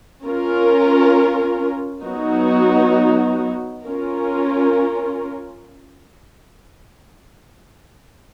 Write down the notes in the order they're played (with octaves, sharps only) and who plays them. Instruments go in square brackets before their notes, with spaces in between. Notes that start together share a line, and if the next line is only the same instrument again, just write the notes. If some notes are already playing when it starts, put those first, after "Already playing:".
[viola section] C#4 F4 A#4
F#3 B3 D#4 F#4
C#4 F4 A#4